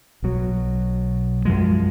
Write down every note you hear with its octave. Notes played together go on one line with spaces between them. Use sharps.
B1 B2 F#3
F#2 F3 G#3